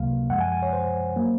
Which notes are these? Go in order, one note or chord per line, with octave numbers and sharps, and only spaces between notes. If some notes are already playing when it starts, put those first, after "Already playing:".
Already playing: C#2 C3 F#3 A#3 F5
F#2 F3 G#3 F#5
G#5
G#5
C#5
C5
F#3 A#3